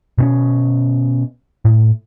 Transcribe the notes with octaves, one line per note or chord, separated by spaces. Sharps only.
B2 C4 C#4
A2